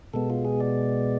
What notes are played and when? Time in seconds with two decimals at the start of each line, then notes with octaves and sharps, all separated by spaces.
0.14 B2 G#3 B3 A4
0.30 F4
0.45 G#4
0.60 D5